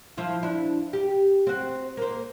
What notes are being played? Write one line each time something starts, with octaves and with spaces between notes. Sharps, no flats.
F3 E4 F4
D4 E4
G4
C4 F#4
A#3 C5